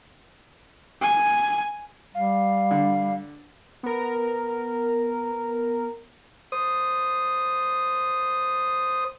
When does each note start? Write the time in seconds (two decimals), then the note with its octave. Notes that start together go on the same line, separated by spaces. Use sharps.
1.02 G#5
2.15 G3 F5
2.71 D3
3.83 B3 A#4
6.52 C5 D#6